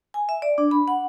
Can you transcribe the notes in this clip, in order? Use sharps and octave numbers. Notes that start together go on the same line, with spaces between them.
G#5
E5
D5
D4
B5
F#5